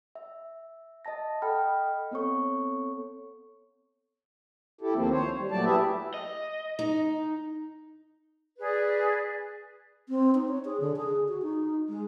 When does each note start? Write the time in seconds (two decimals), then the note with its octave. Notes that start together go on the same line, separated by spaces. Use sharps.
0.15 E5
1.05 D#5 E5 A5 A#6
1.42 A4 D#5 F#5 G5 B5 F6
2.11 B3 C4 A4 C#5 C#6
4.81 E4 G4 A4
4.94 D2 D#3 F3 A#3 C4
5.11 C5 C#5
5.38 G3
5.51 A#2 F#3 A3 D5 A5
5.65 E4 G4 G#4 B4 E5
6.14 D#5
6.79 D#4
8.58 G#4 B4 D5
10.09 C4
10.35 D#4
10.48 C#5
10.65 G#4
10.80 D3
10.96 G#4
11.28 F#4
11.42 D#4
11.89 G#3